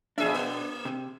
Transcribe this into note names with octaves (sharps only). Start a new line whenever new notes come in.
F2 B2 D4 G#4 E5
A#3
C3